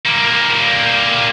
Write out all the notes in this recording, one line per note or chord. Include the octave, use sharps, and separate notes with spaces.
G3 A#3